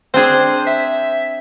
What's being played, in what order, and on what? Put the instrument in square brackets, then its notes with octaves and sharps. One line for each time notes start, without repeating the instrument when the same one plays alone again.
[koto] C4 D4 G#4 [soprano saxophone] C5
[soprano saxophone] E5